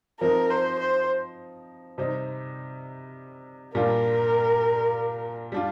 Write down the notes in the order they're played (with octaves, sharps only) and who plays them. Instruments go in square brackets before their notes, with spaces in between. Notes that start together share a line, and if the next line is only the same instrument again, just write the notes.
[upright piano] F3 C4 D#4 [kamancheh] A#4
[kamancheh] C5
C5
[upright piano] C3 G3 C4 D#4
[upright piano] A#2 G3 D4 F4 [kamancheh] A#4
[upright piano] G3 D4 F4